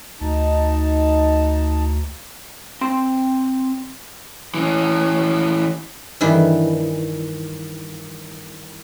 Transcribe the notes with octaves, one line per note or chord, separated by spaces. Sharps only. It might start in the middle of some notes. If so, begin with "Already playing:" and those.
D2 D#4 A5
C4 C6
E3 C#4
G2 D#3 E3